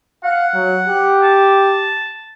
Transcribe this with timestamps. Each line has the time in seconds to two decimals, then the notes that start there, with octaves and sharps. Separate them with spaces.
0.24 F5 F#5
0.54 F#3
0.88 G4
1.23 A5